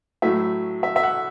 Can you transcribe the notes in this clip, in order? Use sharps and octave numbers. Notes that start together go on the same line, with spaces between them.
A2 F#3 A3 E5
E5
E5
F#5